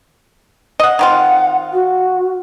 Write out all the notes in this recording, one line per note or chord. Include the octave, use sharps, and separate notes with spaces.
D#5 F#5
D#3 C4 F4 F#5
F#4